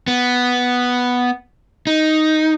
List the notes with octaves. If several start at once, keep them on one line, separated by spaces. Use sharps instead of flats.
B3
D#4